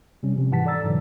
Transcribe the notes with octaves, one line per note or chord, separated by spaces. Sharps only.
C3 G3 C#4
C3 F3
G#2 E3 F#5 A5 B6
A4 D5 A#5 E6 A6
G#2 B2 D3 E3 F#3